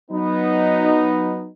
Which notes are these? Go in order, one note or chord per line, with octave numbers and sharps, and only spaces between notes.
F#3 B3 D#4